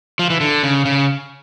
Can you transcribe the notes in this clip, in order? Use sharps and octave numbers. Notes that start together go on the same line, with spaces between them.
F3
E3
D3
C#3
C#3